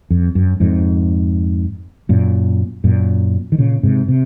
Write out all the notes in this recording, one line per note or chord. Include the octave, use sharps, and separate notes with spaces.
F2
F#2
F2 G#2
F#2 A#2
F#2 A#2
D#3
A#2 C#3
G#2 C3
C3